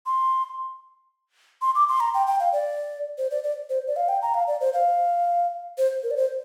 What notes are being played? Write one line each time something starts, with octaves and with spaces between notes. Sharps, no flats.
C6
C6
D6
C6
A#5
G5
G5
F5
D5
C5
D5
D5
C5
D5
F5
G5
A#5
F5
D5
C5
F5
C5
A#4
D5
C5